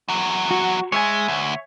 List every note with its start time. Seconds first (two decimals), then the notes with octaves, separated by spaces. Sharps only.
0.08 E2 F#3
0.51 F#4
0.92 G#3 C#5 E5 G#5
1.28 D2